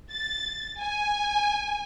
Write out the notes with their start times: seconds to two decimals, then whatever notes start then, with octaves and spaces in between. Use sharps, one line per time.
0.11 A6
0.81 G#5